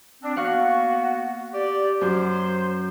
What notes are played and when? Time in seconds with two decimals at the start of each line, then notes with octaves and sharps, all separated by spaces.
0.22 C4 D4
0.36 A#3 B3 F#4 F5 F#5 C#6
1.54 G4 D5
2.01 F#2 C5